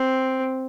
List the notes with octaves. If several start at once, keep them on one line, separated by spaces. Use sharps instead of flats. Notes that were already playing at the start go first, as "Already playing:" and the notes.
Already playing: C4